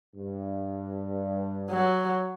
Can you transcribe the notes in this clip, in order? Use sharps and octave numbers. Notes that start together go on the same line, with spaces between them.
G2
F#3